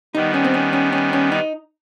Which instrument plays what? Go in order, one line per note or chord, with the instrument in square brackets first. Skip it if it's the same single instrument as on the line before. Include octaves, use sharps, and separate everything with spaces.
[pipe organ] D#3 G3 B3 [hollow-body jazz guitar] D#4
[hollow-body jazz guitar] C#4
C4
C#4
C#4
C#4
C#4
D#4